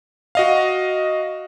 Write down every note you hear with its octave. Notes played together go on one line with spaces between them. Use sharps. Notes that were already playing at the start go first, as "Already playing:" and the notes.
F#4 D#5 F5